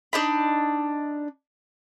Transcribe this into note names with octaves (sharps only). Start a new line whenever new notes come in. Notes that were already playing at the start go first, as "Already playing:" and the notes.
D4 D#4 B5